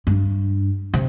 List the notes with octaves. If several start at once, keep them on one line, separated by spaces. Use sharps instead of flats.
G2
C3